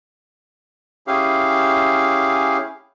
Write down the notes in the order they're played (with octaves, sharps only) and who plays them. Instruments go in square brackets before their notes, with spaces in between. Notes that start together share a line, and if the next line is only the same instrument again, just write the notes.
[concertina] C#4 E4 G4 G#4 F5